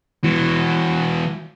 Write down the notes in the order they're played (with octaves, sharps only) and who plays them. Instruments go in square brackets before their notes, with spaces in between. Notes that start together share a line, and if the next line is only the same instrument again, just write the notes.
[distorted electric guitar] E3 F#4